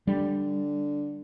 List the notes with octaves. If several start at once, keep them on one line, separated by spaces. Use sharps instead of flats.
D3 G3